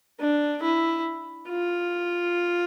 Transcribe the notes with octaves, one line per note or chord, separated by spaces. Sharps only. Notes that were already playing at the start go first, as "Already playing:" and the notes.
D4
E4
F4